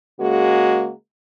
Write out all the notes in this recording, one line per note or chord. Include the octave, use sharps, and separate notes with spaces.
C#3 G#3 A#3 F#4